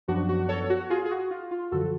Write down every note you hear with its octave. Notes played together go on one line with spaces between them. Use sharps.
F#2 F3 B3 D4 F#4
F#4
A4 C#5
F#4
F4 G#4
G#4
F#4
F4
F4
F#2 D3 F3 F#4 A4